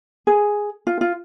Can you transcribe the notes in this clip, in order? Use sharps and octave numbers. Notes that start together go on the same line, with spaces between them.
G#4
F4
F4